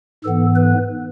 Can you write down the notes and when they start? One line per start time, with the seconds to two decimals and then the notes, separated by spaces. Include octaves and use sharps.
0.24 G#2 E3 B3 A4
0.55 B4